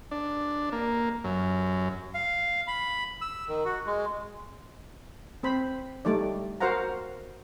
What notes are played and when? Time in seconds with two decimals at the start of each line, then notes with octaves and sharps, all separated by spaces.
0.11 D4
0.72 A#3
1.24 F#2
2.14 F5
2.68 B5
3.22 E6
3.48 D#3
3.65 F#4
3.86 G#3
5.43 C4 C5 B5
6.05 G3 A3 D#4 D5
6.60 F#4 A#4 C5 F5 F#5 A#5